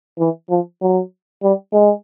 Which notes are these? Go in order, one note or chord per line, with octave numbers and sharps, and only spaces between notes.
E3
F3
F#3
G3
G#3